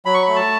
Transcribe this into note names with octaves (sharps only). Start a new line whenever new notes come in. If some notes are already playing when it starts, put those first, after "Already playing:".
F#3 B5
C#6
B5
A3
A5